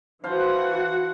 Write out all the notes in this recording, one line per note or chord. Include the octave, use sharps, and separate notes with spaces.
E3 F3 F#4 C5 F5 F#5